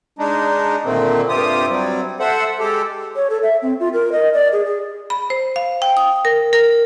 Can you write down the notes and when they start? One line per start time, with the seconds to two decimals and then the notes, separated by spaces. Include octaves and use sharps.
0.19 G#3 D4 D#4
0.85 A#2 D3 D#3 A3 A#3 C4
1.29 G2 C3 C4 F4 G4 D#6
1.70 F#3 G3 C4
2.20 A4 C5 E5 F#5
2.59 G#3 G4 A4
3.16 C#5
3.30 A4
3.43 E5
3.62 C4
3.80 F4
3.93 A#4
4.12 D#5
4.34 D5
4.53 G#4
4.66 G#4
5.10 B5
5.30 C5
5.56 F5
5.82 G5
5.97 D#6
6.25 A#4
6.53 A#4